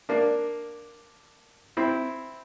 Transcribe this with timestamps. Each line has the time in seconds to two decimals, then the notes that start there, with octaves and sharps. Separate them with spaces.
0.09 A#3 D4
1.77 C4 E4